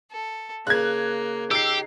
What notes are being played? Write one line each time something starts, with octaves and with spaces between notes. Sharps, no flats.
A4
C#3 A#3 F#6 G#6
D#4 G4 E6 C7